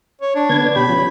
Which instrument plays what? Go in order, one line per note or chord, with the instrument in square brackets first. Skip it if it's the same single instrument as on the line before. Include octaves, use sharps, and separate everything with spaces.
[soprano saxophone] C#5
D4
[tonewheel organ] D3 B3 G#6
[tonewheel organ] B2 G4 [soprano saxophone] B5
[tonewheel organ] F3 C#4